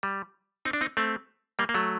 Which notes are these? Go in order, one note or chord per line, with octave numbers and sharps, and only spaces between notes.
G3
C4 D#4
D4
C4 D#4
A3 C4
G3 A#3
A#3
F#3 A3